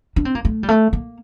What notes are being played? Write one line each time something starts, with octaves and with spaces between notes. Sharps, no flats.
D4
C4
A#3
A3
G3
A3
A#3